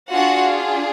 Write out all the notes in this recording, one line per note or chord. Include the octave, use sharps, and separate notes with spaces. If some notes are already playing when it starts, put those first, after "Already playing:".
D4 F4 F#4 G#4 F#5